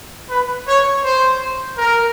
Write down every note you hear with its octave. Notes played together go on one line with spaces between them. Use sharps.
B4
C#5
C5
A#4